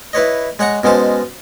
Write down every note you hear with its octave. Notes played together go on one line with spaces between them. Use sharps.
E4 B4 C#5 D#5
G#3 C#5 F#5 A#5 C#6
B2 G#3 C#4 C5 A5